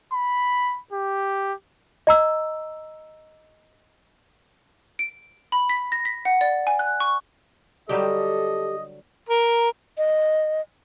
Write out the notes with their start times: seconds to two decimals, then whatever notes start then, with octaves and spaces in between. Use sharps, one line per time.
0.13 B5
0.92 G4
2.07 D#5 A#5 E6
4.99 D7
5.52 B5
5.69 B6
5.92 A#6
6.05 B6
6.25 F#5
6.41 D5
6.67 G#5
6.79 F#6
7.00 C#6
7.89 D3 F#3 G3 G4 A4 D#5
9.29 A#4
9.98 D#5